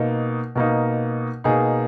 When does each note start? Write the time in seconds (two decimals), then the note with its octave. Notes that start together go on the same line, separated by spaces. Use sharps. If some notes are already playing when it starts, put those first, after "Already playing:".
Already playing: B2 A#3 D#4
0.56 B2 A#3 D#4
1.44 B2 A#3 D#4 G#4